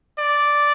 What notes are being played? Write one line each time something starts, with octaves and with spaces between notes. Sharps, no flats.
D5